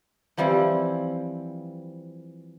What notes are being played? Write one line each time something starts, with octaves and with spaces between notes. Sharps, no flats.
E3 F3 G3 C4 E4